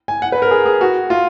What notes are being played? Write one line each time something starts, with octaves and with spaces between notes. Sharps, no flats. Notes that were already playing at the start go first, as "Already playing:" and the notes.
G#5
F#5
B4
A#4
G#4
G#4
F#4
F4